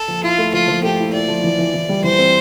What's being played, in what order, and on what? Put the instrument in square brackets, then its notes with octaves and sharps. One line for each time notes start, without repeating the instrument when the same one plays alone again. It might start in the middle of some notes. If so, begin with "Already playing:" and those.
Already playing: [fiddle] A4
[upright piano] F3
[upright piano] E4 [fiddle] F4
[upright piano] A3
[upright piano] F3 [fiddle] F4
[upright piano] F3
[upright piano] A3 [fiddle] G4
[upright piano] E4
[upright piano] E4 [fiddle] D5
[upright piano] F3
E3
E3
E3
G3
[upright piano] E3 [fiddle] C5
[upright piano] C4